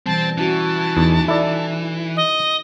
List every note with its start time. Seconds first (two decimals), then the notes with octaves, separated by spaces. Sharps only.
0.06 B2 E3 G3 C4 A5
0.38 E3 C#4 E4 F#4 A5
0.97 E2 D#4
1.28 E4 A4 D5
2.16 D#5